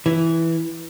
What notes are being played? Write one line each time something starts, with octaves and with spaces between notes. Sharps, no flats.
E3